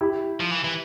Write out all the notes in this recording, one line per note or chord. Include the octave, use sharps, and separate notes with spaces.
E4 G4
F3
E3
E3